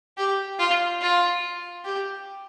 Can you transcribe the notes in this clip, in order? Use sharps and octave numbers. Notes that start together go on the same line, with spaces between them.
G4
F4
F4
G4